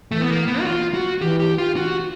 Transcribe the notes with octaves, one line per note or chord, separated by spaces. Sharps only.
E3 A3
B3
A#3
B3
F#4
F4
F#4
E3 G4
G4
F4
F#4